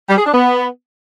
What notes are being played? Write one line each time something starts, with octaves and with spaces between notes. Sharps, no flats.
G3
G#4
D4
B3